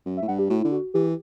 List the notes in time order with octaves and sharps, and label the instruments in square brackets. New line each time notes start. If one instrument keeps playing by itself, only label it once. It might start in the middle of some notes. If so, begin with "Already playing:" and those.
[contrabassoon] F#2
[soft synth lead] E5
[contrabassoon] A2
[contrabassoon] G2 [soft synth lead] F#5
[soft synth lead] G4
[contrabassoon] A2 [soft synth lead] F#4
[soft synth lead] E4
[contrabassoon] D3
[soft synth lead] F#4
[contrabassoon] E3 [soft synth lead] G4